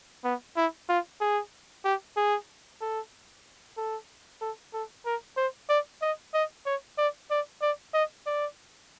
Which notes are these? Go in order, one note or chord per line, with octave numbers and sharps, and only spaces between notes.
B3
E4
F4
G#4
G4
G#4
A4
A4
A4
A4
A#4
C5
D5
D#5
D#5
C#5
D5
D5
D5
D#5
D5